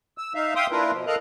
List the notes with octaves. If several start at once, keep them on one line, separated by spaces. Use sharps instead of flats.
E6
D#4 E5 F5
E5 F5 G5 C6 D#6
A#3 D4 E4 F4 A#4 B4
B2 F3
A4 A#4 D#5 F5 A#5 F#6